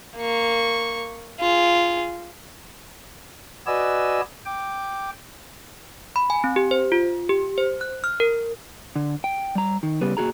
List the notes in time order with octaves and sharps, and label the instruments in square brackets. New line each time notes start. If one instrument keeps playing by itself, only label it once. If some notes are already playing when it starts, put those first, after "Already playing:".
[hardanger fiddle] A#3 C#6
F4 G#4
[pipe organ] F#4 B4 D5 D#5 G#5 E6
G5 D6
[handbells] B5
G#5
C4
G4
C5
F4
G4
C5
F#6
F6
A#4
[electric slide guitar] D3
G5
G3 A#5
D#3
C#3 G3 B3
A#2 D#3 F#4 G#4 A#5